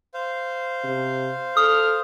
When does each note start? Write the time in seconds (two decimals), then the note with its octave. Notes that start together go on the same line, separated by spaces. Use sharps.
0.14 C5 F5
0.84 C3
1.57 A4 D#6 F6